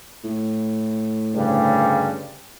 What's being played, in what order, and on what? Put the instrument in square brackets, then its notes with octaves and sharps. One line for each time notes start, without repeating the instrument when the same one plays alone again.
[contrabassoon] A2
[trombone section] D2 G2 C#3